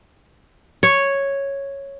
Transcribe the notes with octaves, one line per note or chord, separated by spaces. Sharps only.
C#5